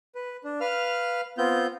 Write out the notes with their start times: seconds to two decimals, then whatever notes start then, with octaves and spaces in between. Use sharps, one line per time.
0.15 B4
0.44 D4
0.61 B4 F5 F6
1.38 B3 C4 F4 G6